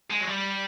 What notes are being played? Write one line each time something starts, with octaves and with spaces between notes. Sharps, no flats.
G#3
F#3
G3